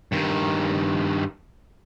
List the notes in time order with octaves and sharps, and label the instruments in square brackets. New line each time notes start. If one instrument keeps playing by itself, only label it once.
[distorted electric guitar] G2 D#3